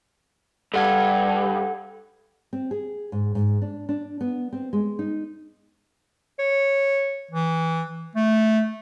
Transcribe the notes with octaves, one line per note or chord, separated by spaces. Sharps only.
G2 A4 F#5 G#6
C4
G#4
G#2
G#2
D4
D4
B3
C4
G#3
D#4
C#5
E3
A3